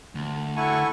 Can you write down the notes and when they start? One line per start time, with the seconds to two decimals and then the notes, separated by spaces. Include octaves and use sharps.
0.15 D2
0.57 E4 A4 F#5 G#5 C#6